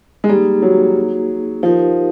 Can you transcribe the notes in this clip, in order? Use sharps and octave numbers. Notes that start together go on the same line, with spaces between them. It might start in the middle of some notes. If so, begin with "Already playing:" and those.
G#3
G3 A#3 D#4 G#4
F#3
F3 D#4 G4 A#4